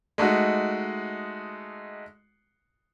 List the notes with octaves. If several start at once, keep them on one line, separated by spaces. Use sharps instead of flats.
G#3 A3 D#4 F#4